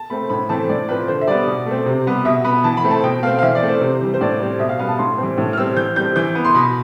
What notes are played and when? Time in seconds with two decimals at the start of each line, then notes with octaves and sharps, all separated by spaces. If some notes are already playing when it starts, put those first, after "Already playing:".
Already playing: A5
0.10 A3 C4 B5
0.30 A2 B5
0.49 E3 A3 C4 A5
0.69 A2 D5
0.89 F3 C4 B4
1.08 D3 C5
1.21 E5
1.27 G3 B3 D5
1.47 B2
1.66 A3 C4
1.86 C3
2.06 G3 B3
2.25 B2 E5
2.44 B3 B5
2.64 E3 A5
2.77 B5
2.84 A3 C4
2.91 A5
3.03 B2 G5
3.23 A3 C4 F5
3.39 F5
3.43 E3 E5
3.55 D5
3.62 A3 C4
3.69 C5
3.81 C3 C5
4.01 E3 G3
4.14 C5
4.21 A2 D5
4.40 G3 C4
4.59 B2 E5
4.69 F5
4.79 G3 B3 F5
4.89 A5
4.98 A2 C6
5.18 E3 G3 C4
5.38 A2
5.53 F6
5.57 G3 C4 E6
5.77 E3 G6
5.96 G3 C4 G6
6.16 E3 G6
6.35 B3
6.45 C6
6.55 B2 B5